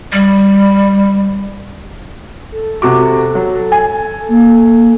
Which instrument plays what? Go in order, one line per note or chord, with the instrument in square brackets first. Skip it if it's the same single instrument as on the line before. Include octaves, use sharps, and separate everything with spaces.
[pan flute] G3
[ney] A4
[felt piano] C3 F#4 D6
F#3
G#5
[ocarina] A#3